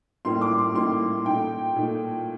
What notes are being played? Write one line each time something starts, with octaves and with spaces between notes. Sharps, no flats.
A2 G3 A#3 D#4 C6
D6
C6
A2 G3 A#3 D#4 C6
A#2 A3 D#4 G5
A#2 A3 D#4